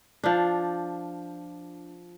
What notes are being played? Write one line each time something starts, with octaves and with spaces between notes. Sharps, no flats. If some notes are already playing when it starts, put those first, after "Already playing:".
F3 D4